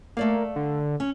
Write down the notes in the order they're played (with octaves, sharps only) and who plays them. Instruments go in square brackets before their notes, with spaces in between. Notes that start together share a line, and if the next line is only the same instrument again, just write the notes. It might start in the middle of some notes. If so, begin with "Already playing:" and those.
[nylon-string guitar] A3 D5 F5 [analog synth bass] A#3
[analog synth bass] D3
[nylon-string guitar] C#4